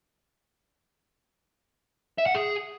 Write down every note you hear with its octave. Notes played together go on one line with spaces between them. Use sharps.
E5
F#5
G#4